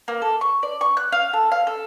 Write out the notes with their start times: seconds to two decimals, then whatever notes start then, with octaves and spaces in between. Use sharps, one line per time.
0.08 A#3
0.22 A4
0.41 C#6
0.63 D5
0.81 C#6
0.97 F#6
1.12 F5
1.33 A4
1.52 F5
1.67 A4